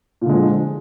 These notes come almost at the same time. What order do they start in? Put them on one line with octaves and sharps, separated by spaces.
A#2 D3 G#3 F3